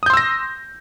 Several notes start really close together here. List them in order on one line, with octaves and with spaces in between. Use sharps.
D#6 G6 C6 E6 A#6